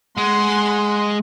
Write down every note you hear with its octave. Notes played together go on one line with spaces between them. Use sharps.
G#3 F#5 C6